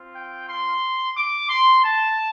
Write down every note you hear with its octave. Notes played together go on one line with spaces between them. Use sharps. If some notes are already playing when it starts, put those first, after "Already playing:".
Already playing: C4 F4
G5
C6
D6
C6
A5